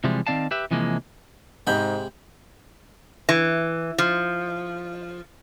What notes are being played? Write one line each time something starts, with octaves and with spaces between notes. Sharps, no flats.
C3 E3 F3 G3 G#3
D#3 B3 C4 D5 F5 A5
G4 B4 E5
C3 E3 F3 G#3 A#3
G#2 C3 G#3 D#5 B5 G6
E3
F3